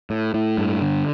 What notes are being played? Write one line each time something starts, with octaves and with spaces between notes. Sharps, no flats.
A2
A2
G2
D3